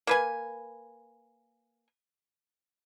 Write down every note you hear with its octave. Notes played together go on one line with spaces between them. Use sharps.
A#3 B4 G#5